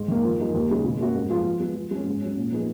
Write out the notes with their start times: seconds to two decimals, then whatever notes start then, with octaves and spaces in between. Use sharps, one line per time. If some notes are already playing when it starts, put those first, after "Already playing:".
Already playing: G#2
0.08 D#3 A#3
0.23 F3
0.38 G#3 D#4 A#4
0.54 D#2
0.69 C#3 G#3 D#4 G#4
0.84 B2
1.00 A#3 C#4 F#4
1.14 G#2
1.30 F3 B3 F4 G#4
1.45 F3
1.60 G#3 B3
1.75 F3
1.91 G#3 C#4
2.06 G#2
2.22 F#3 C#4
2.36 A#2
2.51 F3 B3 D#4 G#4